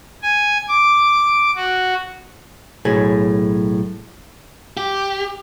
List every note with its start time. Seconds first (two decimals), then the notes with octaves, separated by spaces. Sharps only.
0.23 G#5
0.68 D6
1.56 F#4
2.85 B1 A2 G#4
4.77 G4